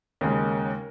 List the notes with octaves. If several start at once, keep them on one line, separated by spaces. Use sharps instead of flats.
D#2 C#3 G#3 A#4